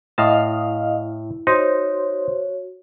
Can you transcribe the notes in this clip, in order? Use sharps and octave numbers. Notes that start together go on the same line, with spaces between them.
A2 E4 D#5 F5 A5 F6
D#4 F#4 C5 C#5